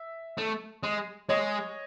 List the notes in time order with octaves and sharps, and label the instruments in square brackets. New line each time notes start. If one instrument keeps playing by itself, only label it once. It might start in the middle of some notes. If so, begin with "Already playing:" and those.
Already playing: [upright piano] E5
[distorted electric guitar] A3
G#3
[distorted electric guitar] G#3 [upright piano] C#5 D#5